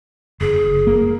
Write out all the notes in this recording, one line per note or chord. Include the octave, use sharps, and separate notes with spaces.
F#1 G#4
A#3